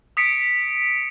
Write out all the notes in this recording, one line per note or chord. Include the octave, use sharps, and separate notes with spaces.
D#6 B6 C#7 D7